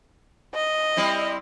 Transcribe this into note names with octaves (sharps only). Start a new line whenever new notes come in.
D#5
G3 C4 E4